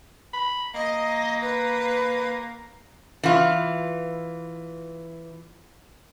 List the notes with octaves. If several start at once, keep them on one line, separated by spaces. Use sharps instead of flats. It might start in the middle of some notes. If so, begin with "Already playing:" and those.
B5
A#3 D#5
B4
E3 F4